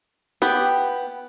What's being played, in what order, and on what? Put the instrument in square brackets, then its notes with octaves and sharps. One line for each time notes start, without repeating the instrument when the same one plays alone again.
[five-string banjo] B3 G4